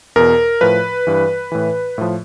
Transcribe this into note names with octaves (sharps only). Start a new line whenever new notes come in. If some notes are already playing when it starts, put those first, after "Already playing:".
E2 B2 A#4
A2 F3 B4
G2 E3
A2 E3
A2 F3